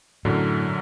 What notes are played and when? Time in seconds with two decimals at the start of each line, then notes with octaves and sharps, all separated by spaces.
0.25 F#2 A2 D3 F#3